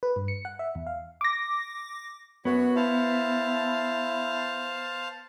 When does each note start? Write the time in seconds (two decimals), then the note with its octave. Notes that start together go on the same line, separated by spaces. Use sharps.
0.03 B4
0.16 G2
0.28 C#7
0.45 F#5
0.59 E5
0.75 E2
0.87 F5
1.21 D6 A#6
2.45 F#2 B3 F#4 C#5
2.76 E4 C5 F5 A5